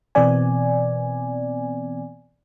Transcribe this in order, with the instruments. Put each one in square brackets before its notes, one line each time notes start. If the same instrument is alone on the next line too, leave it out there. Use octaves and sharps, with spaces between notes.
[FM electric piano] B2 E3 B3 C4 D5 G#5